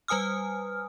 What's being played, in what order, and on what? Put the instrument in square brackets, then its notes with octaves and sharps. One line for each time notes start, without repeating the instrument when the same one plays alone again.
[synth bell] G3 B4 G#5 D#6 F6